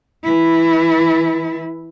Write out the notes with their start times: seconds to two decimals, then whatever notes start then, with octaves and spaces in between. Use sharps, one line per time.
0.24 E3 E4